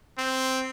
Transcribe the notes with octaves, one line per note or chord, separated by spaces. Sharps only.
C4